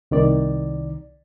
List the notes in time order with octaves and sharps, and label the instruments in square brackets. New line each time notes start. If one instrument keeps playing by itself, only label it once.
[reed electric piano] C2 D#3 D5